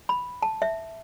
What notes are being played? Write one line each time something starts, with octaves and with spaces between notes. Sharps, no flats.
B5
A5
E5